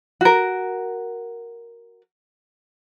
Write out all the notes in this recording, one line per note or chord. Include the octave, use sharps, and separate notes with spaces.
F#4 A#4